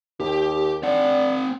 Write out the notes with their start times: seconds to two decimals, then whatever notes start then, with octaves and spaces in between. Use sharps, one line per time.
0.20 D#2 G4
0.83 C4 D4 F#5